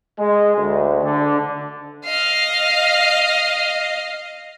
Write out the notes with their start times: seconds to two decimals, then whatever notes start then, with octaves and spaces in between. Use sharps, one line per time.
0.18 G#3
0.57 D2
1.01 D3
2.04 D#5 F5